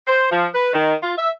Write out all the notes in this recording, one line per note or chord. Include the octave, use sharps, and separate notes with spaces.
C5
F3
B4
D#3
F4
E5